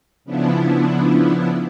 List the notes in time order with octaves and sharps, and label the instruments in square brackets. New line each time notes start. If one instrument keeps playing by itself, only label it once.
[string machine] C#3 F3 B3 D4 E4